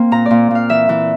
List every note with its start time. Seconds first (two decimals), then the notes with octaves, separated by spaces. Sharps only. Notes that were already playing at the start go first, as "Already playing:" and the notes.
Already playing: A#3 C4
0.12 A#2 A#5
0.26 A#2 D5
0.51 A#2 F5
0.69 E3 E5
0.89 E3